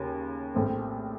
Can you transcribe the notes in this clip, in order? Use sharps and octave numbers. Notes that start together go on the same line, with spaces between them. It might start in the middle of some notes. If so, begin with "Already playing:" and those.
Already playing: D#2 C#3
A#1 A2 A3 C4